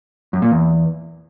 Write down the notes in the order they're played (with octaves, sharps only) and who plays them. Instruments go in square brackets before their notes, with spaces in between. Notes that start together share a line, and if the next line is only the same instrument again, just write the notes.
[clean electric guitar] F#2
A#2
E2